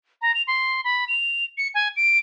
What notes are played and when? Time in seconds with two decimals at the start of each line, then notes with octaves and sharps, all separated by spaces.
0.22 A#5
0.34 F7
0.47 C6
0.84 B5
1.08 F7
1.58 C#7
1.74 G#5
1.96 D7